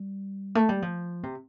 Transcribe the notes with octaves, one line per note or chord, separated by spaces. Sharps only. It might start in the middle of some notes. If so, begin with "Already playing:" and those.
Already playing: G3
A3
G3
F3
C3